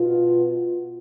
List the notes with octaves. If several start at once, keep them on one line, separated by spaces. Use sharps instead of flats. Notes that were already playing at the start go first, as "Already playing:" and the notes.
Already playing: B2 B3 F4